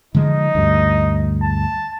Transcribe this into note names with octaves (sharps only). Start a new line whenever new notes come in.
D3 F3 G#3 D#4
D2 G2
A5